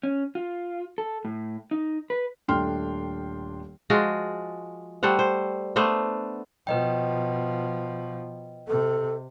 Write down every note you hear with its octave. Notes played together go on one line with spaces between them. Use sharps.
C#4
F4
A4
A2
D#4
B4
D#1 A3 D4 G5 C6 F6
F3 G#3 F4 F#4
G3 A3 C5 F#5
C5
A3 B3 D4 C5
B2 F3 B4 D#5 G5
C3 A4